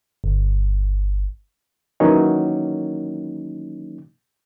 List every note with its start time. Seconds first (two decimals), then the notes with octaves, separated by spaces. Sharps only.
0.24 G1
2.00 D#3 E3 F#3 A#3 C#4 D#4